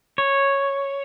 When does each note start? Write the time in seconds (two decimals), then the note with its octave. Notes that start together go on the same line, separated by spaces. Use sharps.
0.18 C#5